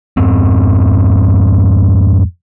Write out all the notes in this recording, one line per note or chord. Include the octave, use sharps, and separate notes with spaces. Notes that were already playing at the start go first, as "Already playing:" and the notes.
F2 G#2 C4